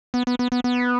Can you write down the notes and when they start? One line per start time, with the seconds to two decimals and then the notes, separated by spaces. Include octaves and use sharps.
0.14 B3
0.27 B3
0.39 B3
0.52 B3
0.64 B3